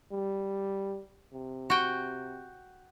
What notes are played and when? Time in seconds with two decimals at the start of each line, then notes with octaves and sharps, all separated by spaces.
0.12 G3
1.33 C3
1.70 F#4 G5